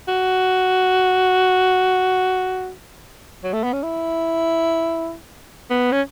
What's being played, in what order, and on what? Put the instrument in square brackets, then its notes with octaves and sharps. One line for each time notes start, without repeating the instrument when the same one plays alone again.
[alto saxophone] F#4
F#3
A3
B3
C#4
E4
B3
C#4